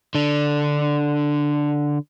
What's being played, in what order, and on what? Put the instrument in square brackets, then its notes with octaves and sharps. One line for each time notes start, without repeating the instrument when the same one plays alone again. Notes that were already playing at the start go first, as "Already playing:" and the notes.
[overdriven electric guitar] D3 D4